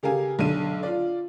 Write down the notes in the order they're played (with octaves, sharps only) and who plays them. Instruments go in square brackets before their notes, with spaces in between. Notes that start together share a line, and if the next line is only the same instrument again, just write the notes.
[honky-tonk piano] C#3 G4 A4 A#4 F5 G#5
B1 D3 D#7
F4 D5